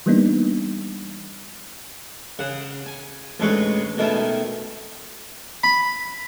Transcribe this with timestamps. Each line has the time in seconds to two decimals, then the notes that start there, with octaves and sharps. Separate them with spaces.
0.06 E3 G3 A#3 B3 D4 D#4
2.39 C#3 F#5
2.86 G#5
3.40 A1 D2 G#2 G#3 B4 C#6
3.97 B2 D#3 A3 C#4 E4
5.63 B5